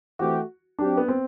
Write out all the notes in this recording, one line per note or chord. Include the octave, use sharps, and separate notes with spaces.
E3 A3 C4 F#4 G4
F#3 C4 D4 G4
B3
C4